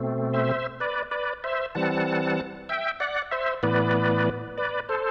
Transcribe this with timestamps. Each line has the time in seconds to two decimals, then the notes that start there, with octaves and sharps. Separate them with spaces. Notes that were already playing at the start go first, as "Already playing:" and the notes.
Already playing: B2 A3 C4
0.34 C5 E5
0.80 B4 D5
1.11 B4 D5
1.44 C5 E5
1.75 E3 G3 C4 F#5 A5
2.69 E5 G5
3.00 D5 F#5
3.31 C5 E5
3.63 A2 E3 B3 B4 D5
4.58 B4 D5
4.89 A4 C5